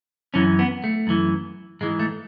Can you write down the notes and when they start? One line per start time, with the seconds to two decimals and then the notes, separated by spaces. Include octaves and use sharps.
0.34 F#2 E3 C#4
0.59 B3
0.84 A3
1.07 F#2 E3
1.81 G#2 E3 G#3
1.99 A3